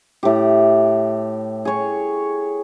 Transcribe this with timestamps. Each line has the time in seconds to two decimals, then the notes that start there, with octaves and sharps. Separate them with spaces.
0.23 A2 G4
1.65 G#4 C#5